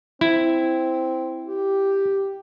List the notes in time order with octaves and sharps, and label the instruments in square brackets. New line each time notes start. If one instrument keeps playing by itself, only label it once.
[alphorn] C4 [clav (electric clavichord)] E4
[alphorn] G4